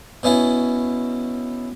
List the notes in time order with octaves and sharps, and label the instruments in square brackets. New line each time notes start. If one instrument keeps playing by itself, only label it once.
[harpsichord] B2 C#4 E4